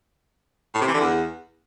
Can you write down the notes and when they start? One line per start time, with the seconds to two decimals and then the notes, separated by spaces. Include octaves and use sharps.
0.75 A2
0.81 C3
0.88 E3
0.94 D3
1.01 E2